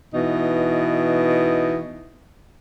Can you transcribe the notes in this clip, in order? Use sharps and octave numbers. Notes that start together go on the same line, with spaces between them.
B2 E3 D#4